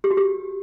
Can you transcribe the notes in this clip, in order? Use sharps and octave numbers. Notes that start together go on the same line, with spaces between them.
G4
F#4
G4